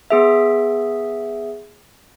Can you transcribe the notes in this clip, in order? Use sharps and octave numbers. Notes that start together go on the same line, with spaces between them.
B3 G#4 E5